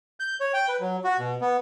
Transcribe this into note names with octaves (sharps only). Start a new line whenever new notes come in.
G6
C#5
G5
B4
F#3
F#4
B2
B3